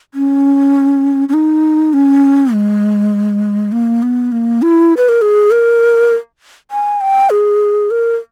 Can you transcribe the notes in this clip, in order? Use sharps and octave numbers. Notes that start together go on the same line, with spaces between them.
C#4
C#4
D#4
C#4
G#3
A#3
B3
A#3
E4
B4
A#4
G#4
A#4
G#5
G5
G#4
A#4